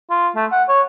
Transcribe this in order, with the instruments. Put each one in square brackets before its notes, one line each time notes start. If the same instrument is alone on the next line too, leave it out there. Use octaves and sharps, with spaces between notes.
[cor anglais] F4
A3
F#5
C#5